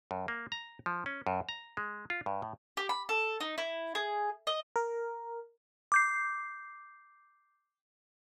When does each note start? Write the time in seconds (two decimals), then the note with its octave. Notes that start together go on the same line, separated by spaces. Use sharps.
0.11 F#2
0.28 A#3
0.52 A#5
0.86 F3
1.06 C#4
1.27 F#2
1.49 A#5
1.77 G#3
2.10 F4
2.26 G2
2.42 A2
2.77 G4
2.89 B5
3.09 A4
3.40 D#4
3.58 E4
3.95 G#4
4.47 D#5
4.76 A#4
5.92 D6 G6 C7